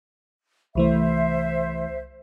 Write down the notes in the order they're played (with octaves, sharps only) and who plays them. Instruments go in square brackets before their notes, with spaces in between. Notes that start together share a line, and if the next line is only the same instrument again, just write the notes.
[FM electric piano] C2 E3 A3 [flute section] C5 E5